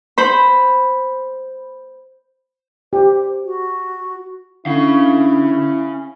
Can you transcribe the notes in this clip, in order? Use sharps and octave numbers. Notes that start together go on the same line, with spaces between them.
C5 B5
G4 C5
F#4
D3 C#4 E4 F5